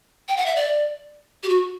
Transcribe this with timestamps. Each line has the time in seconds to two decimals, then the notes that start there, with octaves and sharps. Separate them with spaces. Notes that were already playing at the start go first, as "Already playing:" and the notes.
0.28 G5
0.37 F#5
0.46 E5
0.56 D5
1.43 G4
1.49 F#4